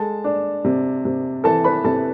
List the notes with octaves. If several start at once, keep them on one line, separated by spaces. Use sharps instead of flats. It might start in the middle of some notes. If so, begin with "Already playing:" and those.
Already playing: G#3 A4 A5
D4
C3
C3
E3 A4 A5
B4 B5
C3 A4 A5